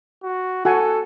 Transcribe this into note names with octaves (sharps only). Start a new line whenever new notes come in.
F#4
F#4 A4 F#5 G#5